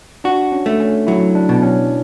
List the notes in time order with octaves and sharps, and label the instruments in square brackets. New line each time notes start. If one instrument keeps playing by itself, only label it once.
[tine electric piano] D4 [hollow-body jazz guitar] F#4
[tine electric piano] C#4
[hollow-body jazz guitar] A3
[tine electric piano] C#4
[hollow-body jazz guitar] F#3 [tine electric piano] E4
[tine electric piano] D4
[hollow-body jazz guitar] B2
[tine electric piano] C#4